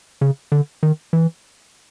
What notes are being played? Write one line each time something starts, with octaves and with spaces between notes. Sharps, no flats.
C#3
D3
D#3
E3